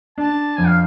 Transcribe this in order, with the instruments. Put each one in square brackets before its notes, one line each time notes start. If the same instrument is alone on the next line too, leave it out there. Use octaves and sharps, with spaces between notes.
[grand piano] D4 [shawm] A5
[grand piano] F2 [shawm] G#5
[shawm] F5